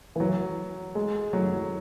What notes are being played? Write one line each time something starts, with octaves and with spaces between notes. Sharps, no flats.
E3
F#3
G#3
F#3